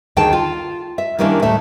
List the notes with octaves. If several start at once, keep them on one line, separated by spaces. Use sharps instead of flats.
D2 D#3 G#4 G5 A5
F4
E5
D#3 G3 A#3 C#4 D4 E4
D2 A2 A3 E5